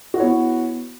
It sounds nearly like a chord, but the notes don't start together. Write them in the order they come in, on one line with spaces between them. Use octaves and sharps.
F#4 E4 C#5 B3